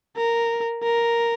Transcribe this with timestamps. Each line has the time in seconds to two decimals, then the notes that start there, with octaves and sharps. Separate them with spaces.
0.17 A#4
0.83 A#4